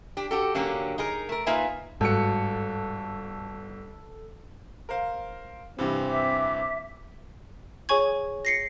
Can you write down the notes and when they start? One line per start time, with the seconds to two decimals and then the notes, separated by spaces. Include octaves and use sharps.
0.17 D4 G4
0.31 F#4 G4 A4
0.55 D3 F#3 A#3 C#4 G4
0.98 D#4 G#4 A#4
1.29 A3 A#4
1.46 A#3 D#4 F4 B4 E5 G#5
2.01 G1 G#2 F#4 A4 C#7
4.89 A#4 C5 F5
5.79 G2 C3 E3 C4
6.08 E5 D6
7.89 G#4 C#5 G#5 C#6 G#6
8.45 A#6 C7 C#7